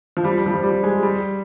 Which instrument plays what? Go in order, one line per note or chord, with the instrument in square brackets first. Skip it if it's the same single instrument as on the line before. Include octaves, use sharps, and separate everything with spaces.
[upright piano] F3
G3
G3
F3
G3
G3
G#3
G3